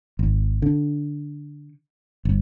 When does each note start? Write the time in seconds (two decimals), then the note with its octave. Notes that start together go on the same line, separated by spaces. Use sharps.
0.19 G#1
0.62 D3
2.25 G1